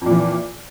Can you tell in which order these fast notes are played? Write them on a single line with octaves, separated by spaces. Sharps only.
F2 A#2 E3